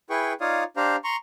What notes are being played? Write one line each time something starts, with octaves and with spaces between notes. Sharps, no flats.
E4 G#4 B4 G5 C#6
D#4 F4 C#5 D5 F5 D#6
D4 G4 C5 F5 A#5
A#5 C6 C#6